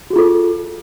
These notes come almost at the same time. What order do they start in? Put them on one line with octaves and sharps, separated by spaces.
F#4 G#4 F4 A4